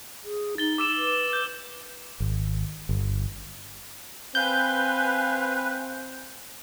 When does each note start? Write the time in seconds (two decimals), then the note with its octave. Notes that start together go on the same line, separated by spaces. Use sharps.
0.24 G#4
0.58 D#4 A6 G7
0.78 D6 E6 E7
0.97 B4
1.33 G6
2.20 G#1
2.89 G1
4.35 C4 B4 F5 G#5 G6